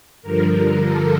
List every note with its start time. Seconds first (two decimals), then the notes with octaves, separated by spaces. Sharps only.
0.22 G2 D3 F3 A#4
0.83 A4